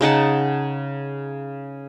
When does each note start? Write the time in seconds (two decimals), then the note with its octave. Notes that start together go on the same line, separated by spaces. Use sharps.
0.01 C#3 D#4 F#5 A5